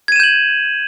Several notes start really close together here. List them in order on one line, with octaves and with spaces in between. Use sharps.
G#6 D#7 E7 G6 F#7